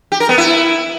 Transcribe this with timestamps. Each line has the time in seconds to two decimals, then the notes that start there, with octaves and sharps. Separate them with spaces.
0.12 G4
0.20 A#4
0.29 B3
0.38 E4